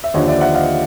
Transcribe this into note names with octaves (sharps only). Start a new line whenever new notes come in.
E5
D#2 D3 F3 C#5 D#5
D5 E5
E5 F#5
D#5 F5